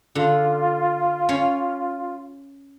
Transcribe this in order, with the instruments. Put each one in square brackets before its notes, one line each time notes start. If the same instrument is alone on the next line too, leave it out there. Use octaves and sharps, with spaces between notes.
[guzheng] D3 [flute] F4
[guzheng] C#4 C#5 F5